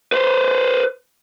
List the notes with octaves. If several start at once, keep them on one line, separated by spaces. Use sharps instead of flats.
B4 C5